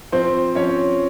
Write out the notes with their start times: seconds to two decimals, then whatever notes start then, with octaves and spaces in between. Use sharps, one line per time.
0.12 F3 C4 C5
0.55 F3 C#4 C#5